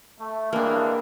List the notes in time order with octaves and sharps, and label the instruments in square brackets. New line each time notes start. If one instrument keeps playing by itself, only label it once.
[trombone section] A3
[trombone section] G2 E3 G#3 [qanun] A#3 D4